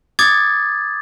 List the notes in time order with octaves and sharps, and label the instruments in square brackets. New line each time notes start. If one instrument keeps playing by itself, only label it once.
[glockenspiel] D6 D#6 G#6 A6